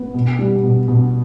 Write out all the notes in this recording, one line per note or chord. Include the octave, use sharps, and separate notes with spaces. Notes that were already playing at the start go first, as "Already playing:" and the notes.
Already playing: B3
B2
G3
B2
B2